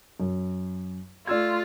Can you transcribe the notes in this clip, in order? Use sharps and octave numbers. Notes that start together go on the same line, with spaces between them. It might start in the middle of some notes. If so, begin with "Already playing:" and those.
F#2
A3 F4 D5 E6 G#6